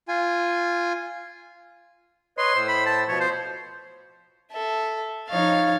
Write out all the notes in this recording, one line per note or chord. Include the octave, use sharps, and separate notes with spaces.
F4 G#5
B4 C#5 D#5 C6
A2 C5 E6
B5
A5
B2 F3 C#5
C5
A4 E5
F3 D#4 C#5 F5 A6